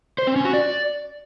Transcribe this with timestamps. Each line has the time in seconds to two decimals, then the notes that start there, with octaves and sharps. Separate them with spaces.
0.18 C5
0.27 C4
0.36 C#4
0.45 F#4
0.53 D5